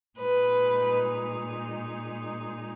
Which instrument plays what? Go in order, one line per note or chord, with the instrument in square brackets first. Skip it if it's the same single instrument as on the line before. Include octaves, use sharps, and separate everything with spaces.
[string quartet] A#2 G#3 D#4 B4